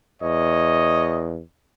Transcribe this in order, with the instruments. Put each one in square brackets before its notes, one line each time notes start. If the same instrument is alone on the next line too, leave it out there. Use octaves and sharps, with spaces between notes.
[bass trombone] E2 [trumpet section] C#5 D#5